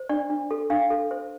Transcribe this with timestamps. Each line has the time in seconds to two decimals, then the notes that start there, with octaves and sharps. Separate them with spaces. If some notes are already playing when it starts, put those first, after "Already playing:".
Already playing: C5
0.09 D4 D5
0.30 D4
0.51 A4
0.70 D4 F5
0.90 A4
1.11 C5